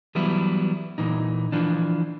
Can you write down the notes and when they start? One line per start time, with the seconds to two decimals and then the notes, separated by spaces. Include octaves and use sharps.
0.15 E3 F#3 G3 B3 E4
0.98 A#2 E3 D#4
1.52 E3 F3 D4